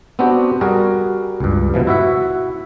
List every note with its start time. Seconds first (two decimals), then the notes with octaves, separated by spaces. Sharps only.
0.19 B3 C4 D4 F#4 G4
0.61 G3 F#4 G#4 A#4
1.40 C#2 G2
1.74 B2 E3 F3
1.87 E4 F#4 E5 F#5